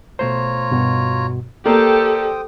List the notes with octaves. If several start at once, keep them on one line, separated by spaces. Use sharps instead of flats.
B2 A3 F4 C5 C#5 A#5
G2 B2 F#4
A#3 G4 A4 C5 D5 G5 D#6